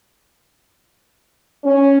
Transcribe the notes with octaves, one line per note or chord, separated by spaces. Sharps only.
C#4